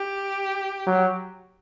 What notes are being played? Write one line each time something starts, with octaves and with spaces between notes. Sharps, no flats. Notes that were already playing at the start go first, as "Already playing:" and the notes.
Already playing: G4
F#3